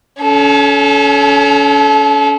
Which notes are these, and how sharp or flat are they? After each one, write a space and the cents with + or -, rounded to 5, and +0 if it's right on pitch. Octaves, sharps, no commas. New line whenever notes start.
C#4 +25 A4 -30